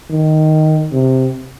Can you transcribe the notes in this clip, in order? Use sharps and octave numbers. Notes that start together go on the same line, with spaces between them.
D#3
C3